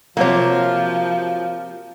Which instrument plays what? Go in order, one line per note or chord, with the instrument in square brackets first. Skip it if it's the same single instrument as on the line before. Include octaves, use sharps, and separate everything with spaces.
[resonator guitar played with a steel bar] C3 A#3 [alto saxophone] F3 [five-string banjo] F#3 C#5